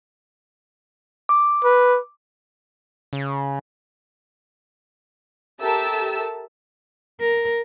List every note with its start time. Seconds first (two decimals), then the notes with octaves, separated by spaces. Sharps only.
1.29 D6
1.64 B4
3.13 C#3
5.61 G4 A4 A#4 E5 A5 E6
7.20 A#4